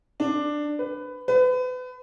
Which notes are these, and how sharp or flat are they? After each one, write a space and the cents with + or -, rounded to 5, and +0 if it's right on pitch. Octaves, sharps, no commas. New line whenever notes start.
D4 +10
B4 +20
B4 +35